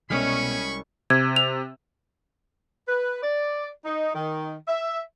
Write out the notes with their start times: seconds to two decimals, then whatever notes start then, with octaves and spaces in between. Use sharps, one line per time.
0.10 C2 B2 G#3 C#4 G#4 B5 C#6 F6
1.10 C3 G#6
1.36 F7
2.88 B4
3.23 D5
3.85 D#4
4.15 D#3
4.68 E5